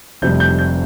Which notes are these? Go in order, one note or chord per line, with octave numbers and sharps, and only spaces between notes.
F1 F2 C3 G3 G6
G6
G6